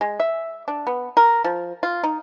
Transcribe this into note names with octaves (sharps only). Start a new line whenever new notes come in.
G#3
E5
D4
B3
A#4
F3
F4
D#4